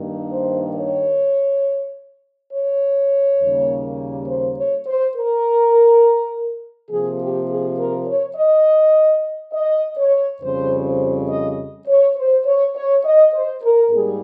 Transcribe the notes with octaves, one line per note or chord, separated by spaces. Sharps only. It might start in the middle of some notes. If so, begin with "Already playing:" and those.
Already playing: G2 D#3 A#3
C5
C#5
C#5
D#2 C#3 G3 A#3
C5
C#5
C5
A#4
C3 F3 A#3 G#4
G4
G#4
A#4
C#5
D#5
D#5
C#5
F2 C#3 G3 C5
C5
D#5
C#5
C5
C#5
C#5
D#5
C5
A#4
G#2 G3 A#3 G#4